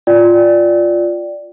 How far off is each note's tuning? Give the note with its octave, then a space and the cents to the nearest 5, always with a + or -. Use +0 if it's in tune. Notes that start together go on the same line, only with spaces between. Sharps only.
F4 +0 D5 +0 G5 -15